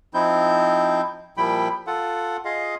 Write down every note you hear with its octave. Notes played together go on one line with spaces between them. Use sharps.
F3 C4 D#4 E4 G6
A#2 F3 G3 E4 G5 B5
F4 A4 F#5
F4 G#4 D#5 F5